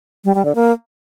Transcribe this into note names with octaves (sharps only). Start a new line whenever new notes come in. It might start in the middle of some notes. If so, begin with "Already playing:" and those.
G3
G3
D3
A#3